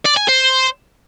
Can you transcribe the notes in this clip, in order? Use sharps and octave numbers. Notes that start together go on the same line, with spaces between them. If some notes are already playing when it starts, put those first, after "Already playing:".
D5
G#5
C5